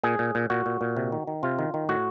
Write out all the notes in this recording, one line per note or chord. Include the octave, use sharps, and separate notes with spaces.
A#2 G#4
A#2
A#2
A#2 F#4
A#2
A#2
C3
D#3
D#3
C3 F4
D#3
D#3
A2 F#4